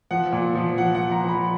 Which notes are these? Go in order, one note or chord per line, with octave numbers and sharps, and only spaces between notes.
F3 F#5
A#2
F3
F3 F#5
F#5
F3
A#5
F3
B5